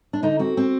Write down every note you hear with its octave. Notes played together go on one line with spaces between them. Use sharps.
D4
D3 D#4
C4 F#4
C4